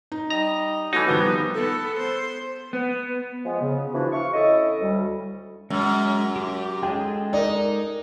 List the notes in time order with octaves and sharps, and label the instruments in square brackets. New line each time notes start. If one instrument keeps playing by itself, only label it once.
[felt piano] D#4
[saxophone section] G3 D#5 [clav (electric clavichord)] A#5
[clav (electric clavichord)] E3 D#4 [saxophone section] A3 C#4 F#4
[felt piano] D#3 G3 [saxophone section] F3 B3
[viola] B3 A4
C5
[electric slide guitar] B3
[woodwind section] F3 G#3 B3
C#3
E3 F3 D4 E4 F#4
E5 F5 C#6
C#4 E4 A4 D#5
D2 G3
[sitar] F#2 [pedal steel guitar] G#3 F6
[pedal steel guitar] G4 C6 D6
[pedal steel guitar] G#3 G#4 A4 [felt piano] G5
[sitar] D#4 [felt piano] A#4 D5